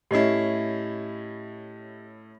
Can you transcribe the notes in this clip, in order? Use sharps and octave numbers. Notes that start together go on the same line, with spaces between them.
A2 C#4 E4 G4 D#5 C7